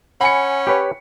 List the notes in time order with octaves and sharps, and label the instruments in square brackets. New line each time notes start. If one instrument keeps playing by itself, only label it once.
[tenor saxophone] C#4 [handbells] F#5 G#5 [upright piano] B5 C#7
[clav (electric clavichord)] G4 B4 C#5